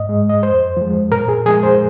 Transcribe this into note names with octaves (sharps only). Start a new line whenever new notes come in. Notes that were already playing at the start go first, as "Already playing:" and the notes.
Already playing: G#2 D#5
G#3
D#5
F2 C5
F3 G#3
A#2 A#4
G#4
F3 G#3 G#4
C5